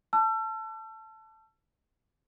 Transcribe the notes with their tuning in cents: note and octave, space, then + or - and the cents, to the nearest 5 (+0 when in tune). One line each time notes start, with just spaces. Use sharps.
A5 +0 E6 +40